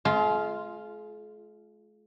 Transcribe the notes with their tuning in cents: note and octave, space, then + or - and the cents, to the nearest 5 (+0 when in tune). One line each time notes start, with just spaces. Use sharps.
G#3 +45 F4 -5 C6 +0